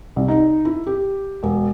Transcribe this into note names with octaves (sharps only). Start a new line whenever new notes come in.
C2
D#4
E4
G4
E1